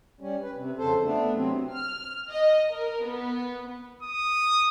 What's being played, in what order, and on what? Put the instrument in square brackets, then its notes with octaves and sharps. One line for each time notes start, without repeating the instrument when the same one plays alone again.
[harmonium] G3 C#4
B4
C3
F2 C#3 A4 C5
A3 B3 D4
C3 F#3 C4
[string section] F6
D#5
A#4
B3
[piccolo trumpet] D#6